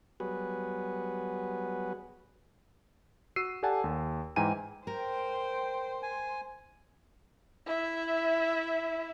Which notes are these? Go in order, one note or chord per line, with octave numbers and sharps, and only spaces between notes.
F#3 G3 B3 F#4 G#4 B4
F#4 E6 C7 D#7
G4 A4 D5 F#5 G#5 A5
D#2
G#2 E3 G5 G#5 A#5 D#7
A#4 C5 G5
G#5
E4 E5